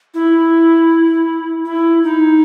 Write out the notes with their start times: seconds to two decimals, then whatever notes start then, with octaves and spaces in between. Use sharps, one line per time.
0.14 E4
1.65 E4
2.04 D#4